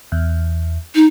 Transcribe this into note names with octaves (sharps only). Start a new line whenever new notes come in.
E2
D#4